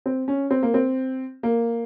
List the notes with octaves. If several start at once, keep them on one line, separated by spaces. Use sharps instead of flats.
C4
C#4
C4
A#3
C4
A#3